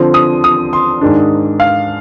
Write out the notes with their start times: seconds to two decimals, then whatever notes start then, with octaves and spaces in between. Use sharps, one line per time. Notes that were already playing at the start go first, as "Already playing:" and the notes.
Already playing: D3 F3 C4
0.14 D#6
0.44 D#6
0.73 C6
1.01 G#2 D#3 G#3 D4
1.60 F5